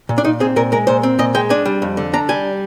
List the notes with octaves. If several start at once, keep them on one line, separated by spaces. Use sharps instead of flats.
A#2
D4
A#2 D#4
C4 G#4
A#2 A#4
G#3 A#4
A#2 C5
C4
A#2 D#5
G#3 G5
D4 G#5
G3
F2
D3
D4 A#5
G3 G#5